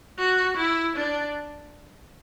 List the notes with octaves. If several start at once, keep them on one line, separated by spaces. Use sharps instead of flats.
F#4
E4
D4